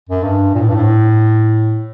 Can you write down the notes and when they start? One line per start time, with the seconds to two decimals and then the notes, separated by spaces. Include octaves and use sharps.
0.09 F#2
0.23 G2
0.54 A#2
0.61 A2
0.69 G2
0.76 A2